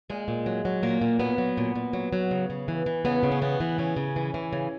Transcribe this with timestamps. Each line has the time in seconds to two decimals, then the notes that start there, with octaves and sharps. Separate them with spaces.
0.10 A#2 G#3
0.28 A#2
0.46 F#3
0.65 F#3
0.83 A#2 A#3
1.01 A#2
1.19 F#3 B3
1.38 F#3
1.57 A#2
1.75 A#2
1.93 F#3
2.13 F#3
2.31 C#3
2.50 C#3
2.68 E3
2.86 E3
3.05 C#3 B3
3.23 C#3
3.32 C#4
3.41 E3 B3
3.60 E3
3.78 C#3 C#4
3.96 C#3
4.16 E3
4.34 E3
4.53 C#3